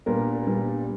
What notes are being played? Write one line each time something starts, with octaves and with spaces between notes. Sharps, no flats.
A#2 G3 B3 D4 A#4
A#2 G3 B3 D4